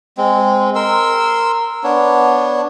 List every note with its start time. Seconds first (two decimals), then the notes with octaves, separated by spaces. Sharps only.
0.18 G#3 C4
0.75 A#4 C6 E6
1.84 B3 D4 C#5